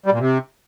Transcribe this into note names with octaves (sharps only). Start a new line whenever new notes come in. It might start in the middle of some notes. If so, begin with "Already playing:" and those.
G3
A#2
C3